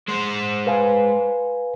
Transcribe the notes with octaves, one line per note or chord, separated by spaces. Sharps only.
G#3 C5
B4 F5 G#5